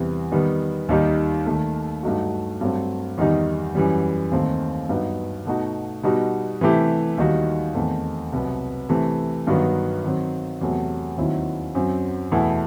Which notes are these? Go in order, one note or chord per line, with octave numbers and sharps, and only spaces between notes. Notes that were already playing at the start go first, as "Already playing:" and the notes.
Already playing: E2 C3 E3 G3
D#3 G3 B3
D#2 D#3 G3 D#4 G4
D#2 D#3 A3
G2 F#3 A3 D#4 F#4
G2 F#3 A3 C4
E2 D#3 G3 D#4
F#2 E3 G3
D#2 D#3 A3 C4
G2 F#3 B3 D#4
B2 A3 D#4 F#4
B2 G3 D#4 F#4
C3 E3 A3 E4 G4
D#2 D#3 G3 D#4 F#4
E2 D#3 A3 C4
C2 B2 F#3 B3
C3 E3 A3
G2 D#3 F#3 B3 F#4
D#3 F#3 C4
E2 C3 F#3 A3
D#2 D#3 F#3 C4 E4
F#2 F#3 C4
E2 B2 A3 E4